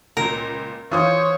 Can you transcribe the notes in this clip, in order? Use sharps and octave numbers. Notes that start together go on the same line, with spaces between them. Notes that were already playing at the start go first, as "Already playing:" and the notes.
C#2 A#2 A#4
E3 F4 C5 C#5 D#6